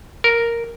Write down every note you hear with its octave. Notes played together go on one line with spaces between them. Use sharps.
A#4